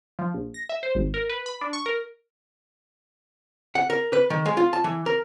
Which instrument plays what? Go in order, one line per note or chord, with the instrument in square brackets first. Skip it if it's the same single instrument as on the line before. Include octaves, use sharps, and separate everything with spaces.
[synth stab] F3
A#1
A#6
E5
C5
G#1
A#4
B4
B5
D4
C#6
A#4
[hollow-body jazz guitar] F#5
A#4
B4
D#3
G#3
F4
A5
E3
A#4